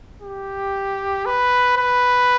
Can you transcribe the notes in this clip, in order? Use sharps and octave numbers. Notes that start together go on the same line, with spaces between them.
G4
B4
B4